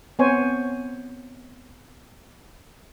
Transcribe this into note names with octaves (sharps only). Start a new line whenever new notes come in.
B3 C4 C5 C#5 G#5